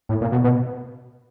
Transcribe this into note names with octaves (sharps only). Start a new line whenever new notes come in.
A2
A#2
B2
B2